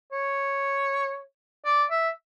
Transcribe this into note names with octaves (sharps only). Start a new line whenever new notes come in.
C#5
D5
E5